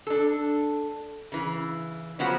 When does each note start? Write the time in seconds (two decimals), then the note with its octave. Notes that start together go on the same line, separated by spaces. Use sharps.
0.07 D4 A4
1.32 C#3 E3
2.19 C#3 F3 F#3 G#3 B3 F#4